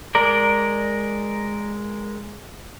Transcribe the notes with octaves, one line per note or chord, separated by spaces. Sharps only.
G#3 A#4 D5